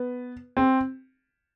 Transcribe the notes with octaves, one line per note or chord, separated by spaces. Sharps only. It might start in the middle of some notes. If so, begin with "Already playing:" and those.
Already playing: B3
C4